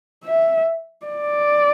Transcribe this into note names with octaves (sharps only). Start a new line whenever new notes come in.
E5
D5